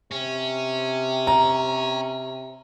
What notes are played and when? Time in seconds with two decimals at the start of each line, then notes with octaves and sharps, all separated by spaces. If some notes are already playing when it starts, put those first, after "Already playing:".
0.11 C3 C#4
1.27 A#5